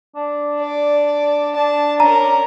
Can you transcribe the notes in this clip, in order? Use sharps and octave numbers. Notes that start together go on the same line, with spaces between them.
D4
D5
D4 A5
C#4 A#4 A#5